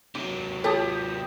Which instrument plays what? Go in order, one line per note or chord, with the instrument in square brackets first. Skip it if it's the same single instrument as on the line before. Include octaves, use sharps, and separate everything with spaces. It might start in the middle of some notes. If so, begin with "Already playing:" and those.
[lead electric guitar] C3 F#3 [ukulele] D#4 [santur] D6
[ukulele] F4 C#5 [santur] G4 B5 D#6 [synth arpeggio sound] A4 A5